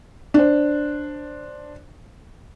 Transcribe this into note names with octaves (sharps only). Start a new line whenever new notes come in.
D4 C5